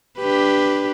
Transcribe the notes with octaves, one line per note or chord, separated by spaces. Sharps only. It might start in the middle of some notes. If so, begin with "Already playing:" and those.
D4 G4 B4